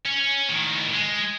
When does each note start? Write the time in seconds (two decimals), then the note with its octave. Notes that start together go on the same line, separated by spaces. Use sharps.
0.05 C#4
0.49 A2 D#3
0.93 G#3